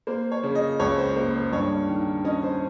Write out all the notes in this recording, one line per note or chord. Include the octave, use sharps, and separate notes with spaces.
A#3 C5
C#5
C#3
D#5
C#2 C#5
C5
A#3
C5
G2 C#5
D#3
C#4 D#5
C5